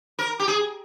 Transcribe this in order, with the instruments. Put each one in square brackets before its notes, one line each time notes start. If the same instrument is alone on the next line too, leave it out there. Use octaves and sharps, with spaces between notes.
[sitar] A#4
G4
G#4